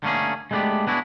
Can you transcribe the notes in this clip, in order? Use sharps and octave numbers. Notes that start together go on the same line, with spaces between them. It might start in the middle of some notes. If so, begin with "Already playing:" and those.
D3 A3 A#3 C#4 G#4
G#3 A3 B3 C#4 D4 G4
B3 D4 E4 F#4 G#4